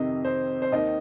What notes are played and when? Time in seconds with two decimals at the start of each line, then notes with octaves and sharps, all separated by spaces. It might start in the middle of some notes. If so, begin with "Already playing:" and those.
Already playing: F2 C3 D#3 D#5
0.25 C5
0.62 C5
0.72 D#2 D#3 D#5